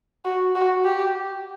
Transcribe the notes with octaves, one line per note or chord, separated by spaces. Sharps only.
F#4
F#4
G4